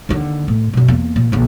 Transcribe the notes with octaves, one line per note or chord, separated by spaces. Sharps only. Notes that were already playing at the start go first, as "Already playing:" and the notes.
D#2 D3
A2
F#2 B2
E2 A#3
A#2
A#1 D3